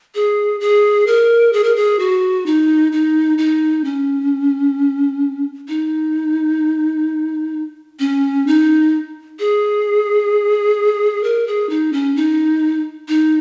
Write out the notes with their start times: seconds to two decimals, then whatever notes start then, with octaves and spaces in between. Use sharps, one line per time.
0.15 G#4
0.60 G#4
1.07 A#4
1.53 G#4
1.64 A#4
1.76 G#4
1.99 F#4
2.46 D#4
2.92 D#4
3.38 D#4
3.84 C#4
5.68 D#4
8.00 C#4
8.47 D#4
9.39 G#4
11.24 A#4
11.47 G#4
11.70 D#4
11.93 C#4
12.16 D#4
13.09 D#4